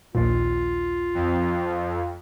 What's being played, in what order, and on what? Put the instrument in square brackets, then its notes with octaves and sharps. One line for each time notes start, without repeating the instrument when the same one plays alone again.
[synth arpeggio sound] A#1 D#2 A#2 [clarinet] F4
[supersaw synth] F2